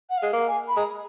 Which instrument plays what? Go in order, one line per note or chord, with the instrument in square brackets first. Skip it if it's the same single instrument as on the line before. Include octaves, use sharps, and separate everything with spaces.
[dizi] F#5
F5
[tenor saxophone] G#3
A#3
[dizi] G#5
B5
[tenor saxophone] G#3 [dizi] A#5